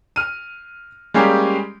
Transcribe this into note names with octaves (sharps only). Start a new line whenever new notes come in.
F6 D#7
G3 G#3 A#3 C#4 G4